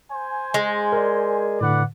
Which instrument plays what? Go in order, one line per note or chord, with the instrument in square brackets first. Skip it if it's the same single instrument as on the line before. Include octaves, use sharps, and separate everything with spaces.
[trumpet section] C5 G#5
[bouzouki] G#3
[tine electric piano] A#4 D5
[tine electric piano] A2 D3 [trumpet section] B4 D5 F#5